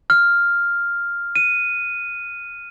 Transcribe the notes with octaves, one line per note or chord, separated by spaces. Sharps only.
F6
D#7